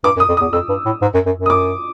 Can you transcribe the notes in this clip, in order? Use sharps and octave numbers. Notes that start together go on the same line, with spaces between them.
G2 D6
F#2
D#6
F2
D#6
E2
F2 E6
G2
A2
G#2
F#2
F#2
F#2
D#6
D6